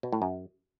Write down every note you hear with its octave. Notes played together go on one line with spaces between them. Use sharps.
B2
A2
F#2